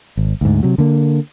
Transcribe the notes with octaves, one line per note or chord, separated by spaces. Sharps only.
G#1
D2 G#2
C3 F#3
D3 A#3